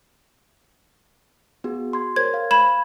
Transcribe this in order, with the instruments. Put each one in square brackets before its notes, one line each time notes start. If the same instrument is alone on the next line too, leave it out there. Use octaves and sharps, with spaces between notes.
[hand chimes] B3 F#4 G#4
C6 G#6
[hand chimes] A#4 C5 C#5 [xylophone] G#6
[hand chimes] F5
[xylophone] B5 G#6 E7